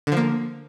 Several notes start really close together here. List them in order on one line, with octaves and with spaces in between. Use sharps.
D3 F3 A#3